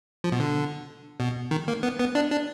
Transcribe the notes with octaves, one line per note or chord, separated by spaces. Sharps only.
F3
B2
D3
B2
D#3
A#3
B3
B3
D4
D4